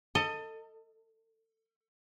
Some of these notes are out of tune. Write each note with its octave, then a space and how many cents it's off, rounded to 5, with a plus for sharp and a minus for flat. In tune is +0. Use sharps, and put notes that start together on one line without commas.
A4 +25 D#5 +0